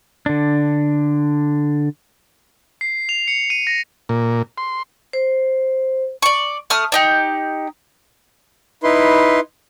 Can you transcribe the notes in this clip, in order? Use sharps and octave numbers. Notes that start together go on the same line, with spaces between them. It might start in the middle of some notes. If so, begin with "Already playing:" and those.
D3 D4
C7
F7
C#7
D#7
A#6
A#2
C6
C5
D5 C#6
A3 D#6 F6
D4 D#4 G4
D#4 E4 B4 C6